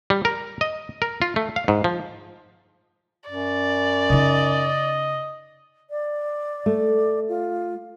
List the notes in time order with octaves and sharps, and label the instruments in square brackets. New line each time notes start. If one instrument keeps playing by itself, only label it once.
[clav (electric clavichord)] G3
A#4
D#5
A#4
F4
A3
F5
G#2
F3
[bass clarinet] F#2 [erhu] D5
[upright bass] C#3 D#4 [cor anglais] D#5
[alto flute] D5
[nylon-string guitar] A3
[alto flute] F4